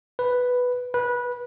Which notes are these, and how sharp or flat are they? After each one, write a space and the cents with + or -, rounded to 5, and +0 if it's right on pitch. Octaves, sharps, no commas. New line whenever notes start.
B4 +0
B4 -20